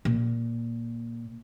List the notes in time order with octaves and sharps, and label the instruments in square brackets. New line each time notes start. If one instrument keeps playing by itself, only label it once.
[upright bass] A#2